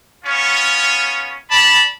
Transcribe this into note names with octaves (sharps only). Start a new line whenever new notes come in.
B3 C#4 F4 C#5
D5 A5 B5